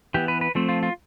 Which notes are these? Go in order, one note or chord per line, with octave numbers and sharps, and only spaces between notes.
E3 B3 G4
B4
B4
F3 A3 C4
F4
F4